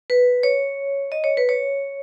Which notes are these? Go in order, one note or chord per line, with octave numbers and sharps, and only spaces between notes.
B4
C#5
D#5
C#5
B4
C#5